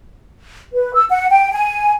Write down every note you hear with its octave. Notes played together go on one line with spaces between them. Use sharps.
B4
E6
F#5
G5
G#5